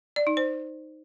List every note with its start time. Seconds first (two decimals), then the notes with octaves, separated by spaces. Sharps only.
0.16 D5
0.27 D#4
0.37 C5